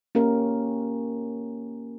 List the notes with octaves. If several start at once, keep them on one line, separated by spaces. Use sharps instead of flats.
A#3 C#4 G4 A#4